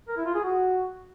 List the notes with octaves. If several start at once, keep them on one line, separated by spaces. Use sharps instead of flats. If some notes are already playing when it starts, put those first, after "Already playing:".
A#4
E4
F4
G#4
F#4